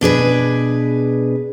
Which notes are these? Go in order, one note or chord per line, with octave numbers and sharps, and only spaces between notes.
B2 D4 G#4 B4